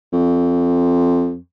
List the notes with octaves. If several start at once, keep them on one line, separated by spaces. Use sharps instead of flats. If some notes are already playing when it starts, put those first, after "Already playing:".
F2